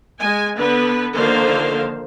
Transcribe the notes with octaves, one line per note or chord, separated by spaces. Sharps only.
G#3 G#5
D3 B3 B4
D3 D#3 F3 A#3 C5 F5